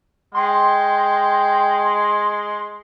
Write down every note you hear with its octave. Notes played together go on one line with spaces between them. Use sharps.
G#3 G5 C6